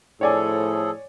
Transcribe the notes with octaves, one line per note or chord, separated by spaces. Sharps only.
A2 F3 G#4 A4 C#5 D5 G#5